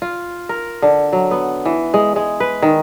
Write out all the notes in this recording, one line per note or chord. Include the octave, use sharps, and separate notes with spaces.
F4
A#4
D3
F#3
B3
E3
G#3
G#3
B4
D#3